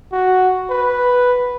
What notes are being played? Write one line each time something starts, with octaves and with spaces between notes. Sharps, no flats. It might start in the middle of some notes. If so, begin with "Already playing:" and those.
F#4
B4